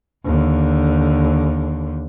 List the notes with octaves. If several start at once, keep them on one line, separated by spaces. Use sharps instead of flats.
D#2 D3